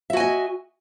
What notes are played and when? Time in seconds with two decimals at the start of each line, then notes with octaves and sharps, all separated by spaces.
0.10 E5
0.13 F#4
0.17 G#5
0.20 D#5